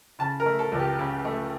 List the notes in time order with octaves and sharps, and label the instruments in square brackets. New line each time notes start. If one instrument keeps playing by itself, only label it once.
[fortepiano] C#3 A5
A#4
A3
A4
C#2
G4
C#3
A3